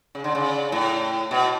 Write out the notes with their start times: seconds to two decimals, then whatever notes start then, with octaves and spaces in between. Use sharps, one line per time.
0.15 C#3
0.24 D3
0.35 C#3
0.72 A2
1.31 B2